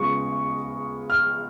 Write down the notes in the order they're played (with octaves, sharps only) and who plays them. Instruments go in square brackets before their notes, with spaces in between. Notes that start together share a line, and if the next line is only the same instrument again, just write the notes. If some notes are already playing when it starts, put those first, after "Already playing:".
Already playing: [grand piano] C#3 G#3 B3 F4 C#6
F6